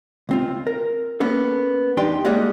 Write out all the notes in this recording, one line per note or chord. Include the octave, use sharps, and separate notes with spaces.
C#2 C4 F4
A#4
A#3 B3 C#4 A4
E2 D4 D#4 G4 G5 C6
G3 G#3 A#3 F#4 G#4 C#5